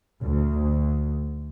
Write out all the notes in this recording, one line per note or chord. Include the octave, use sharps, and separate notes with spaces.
D2